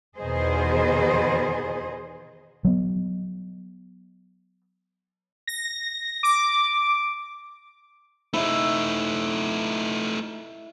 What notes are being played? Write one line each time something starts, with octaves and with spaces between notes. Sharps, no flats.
E2 B2 D#3 G#4 C5 D#5
F#3 B3
A#6
D6
A3 D#4 E4